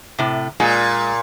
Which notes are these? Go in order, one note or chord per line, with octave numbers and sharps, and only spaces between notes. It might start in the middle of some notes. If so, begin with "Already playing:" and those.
A2 C3
A#2 G#3